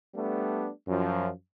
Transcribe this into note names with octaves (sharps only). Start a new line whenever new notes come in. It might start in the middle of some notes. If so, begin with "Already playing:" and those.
G3 A3 B3 D4
F#2 F3